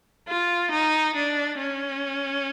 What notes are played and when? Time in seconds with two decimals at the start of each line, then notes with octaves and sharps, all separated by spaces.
0.28 F4
0.71 D#4
1.16 D4
1.58 C#4